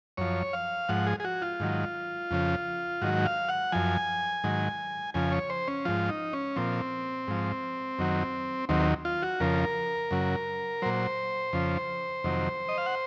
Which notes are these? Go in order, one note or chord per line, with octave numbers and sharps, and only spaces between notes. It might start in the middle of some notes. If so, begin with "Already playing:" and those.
F#2 F3 C#5
F5
G#2 F3 F#5
G#4
G#4
F#4
F4
G#2 D#3 F#3
F2 C#3 F3
G#2 D#3 F#3 F#4
F5
F#5
F#2 F3 G#5
G#2 D#3 F#3
F2 C#3 F3 G#5
C#5
C5
C#4
G#2 F3 F4
D#4
C#4
A#2 F3 C4
G#2 F3
F#2 D#3 F#3
D#2 D#3 F#3 C4
F4
F#4
F2 C#3 F3 A#4
F#2 C#3 F#3
A#2 F#3 C5
F2 C#3 F3
F2 C3 D#3 F#3
D#5
F5
F#5